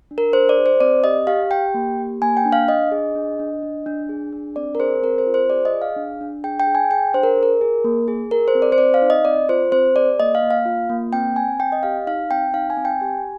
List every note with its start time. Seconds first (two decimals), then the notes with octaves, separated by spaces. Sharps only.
0.11 D4
0.18 A#4
0.33 D4 C5
0.49 D5
0.57 G#4
0.66 C5
0.81 C4 D5
1.04 G4 D#5
1.27 G4 F5
1.51 G4 G5
1.74 A#3
1.98 G4
2.22 A#3 G#5
2.37 G5
2.45 D4
2.53 F5
2.68 D4 D#5
2.92 G#4
3.15 D4
3.39 D4
3.63 D4
3.86 D4
4.09 G#4
4.33 D4
4.56 C4 D5
4.75 A#4
4.80 G#4 C5
5.02 C4 A#4
5.18 C5
5.27 F4
5.34 C5
5.50 G#4 D5
5.65 D#5
5.73 G#4
5.82 F5
5.96 D4
6.21 D4
6.44 G#4 G5
6.60 G5
6.67 G#4
6.75 G#5
6.91 G#4 G5
7.14 D4 C5
7.23 A#4
7.37 G#4
7.43 A#4
7.61 G#4
7.84 A#3
8.08 G#4
8.31 G#4 A#4
8.48 C5
8.55 C4
8.62 D5
8.72 C5
8.78 C4 D5
8.94 F5
9.02 D#4
9.10 D#5
9.25 C4 D5
9.49 F4 C5
9.72 C4 C5
9.96 G#4 D5
10.20 A#3 D#5
10.35 F5
10.42 A#3
10.51 F5
10.66 F4
10.90 A#3
11.13 C4 G5
11.36 C4 G#5
11.60 C4 G5
11.72 D#5
11.83 G4 F5
12.07 D#4 F5
12.31 C4 G5
12.54 D#4 F5
12.70 G#5
12.77 C4
12.85 G5
13.01 G4 G#5